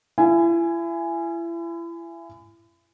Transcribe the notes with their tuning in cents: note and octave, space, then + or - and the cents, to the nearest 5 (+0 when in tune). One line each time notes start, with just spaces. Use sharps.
E4 +35 G#5 -5